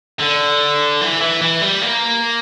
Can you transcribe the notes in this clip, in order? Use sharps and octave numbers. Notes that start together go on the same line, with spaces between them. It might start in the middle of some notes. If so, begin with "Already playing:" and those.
D3
E3
E3
E3
G3
A#3